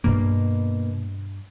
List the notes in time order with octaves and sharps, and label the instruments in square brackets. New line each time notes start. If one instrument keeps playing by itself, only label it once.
[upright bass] G2 G3 [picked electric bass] B2 A#3